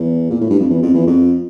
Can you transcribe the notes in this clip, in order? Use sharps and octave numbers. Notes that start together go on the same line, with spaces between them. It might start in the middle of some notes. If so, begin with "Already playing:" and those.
Already playing: E2
A#2
A2
G2
F2
E2
F2
E2
F2